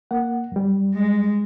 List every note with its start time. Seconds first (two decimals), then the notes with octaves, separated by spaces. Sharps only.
0.11 A#3 F#5
0.52 F#2 G3
0.94 G#3